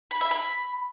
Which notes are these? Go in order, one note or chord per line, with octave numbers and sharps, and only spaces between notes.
B5
E5
B5